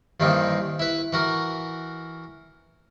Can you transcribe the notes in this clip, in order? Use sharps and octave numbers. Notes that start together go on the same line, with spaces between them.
G2 D#3 E3 A#3 C4
E4 B4
E3 F#4 A#4